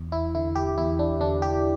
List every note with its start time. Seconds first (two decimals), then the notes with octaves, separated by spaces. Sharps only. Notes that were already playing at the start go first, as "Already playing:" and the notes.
Already playing: E2
0.12 E4
0.35 D3 E4
0.55 G4
0.78 E2 E4
0.99 D4
1.20 D3 D4
1.42 G4